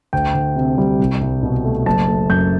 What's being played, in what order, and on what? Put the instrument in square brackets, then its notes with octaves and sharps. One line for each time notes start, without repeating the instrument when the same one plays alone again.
[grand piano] D2 G5
D2
C3
G3
C2
C2
B2
A3
F#1 A5
A3
F#2 G6